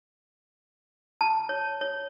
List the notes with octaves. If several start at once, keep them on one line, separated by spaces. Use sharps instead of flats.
A5
C#5
C#5